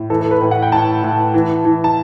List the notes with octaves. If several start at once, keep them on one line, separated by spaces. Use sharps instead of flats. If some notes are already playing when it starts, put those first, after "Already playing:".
Already playing: A2
E3 A4
A4
B4
A2
F#5
G5
A2 A5
A2
E3
E3
A5